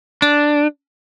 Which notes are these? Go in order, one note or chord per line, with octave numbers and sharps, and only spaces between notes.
D4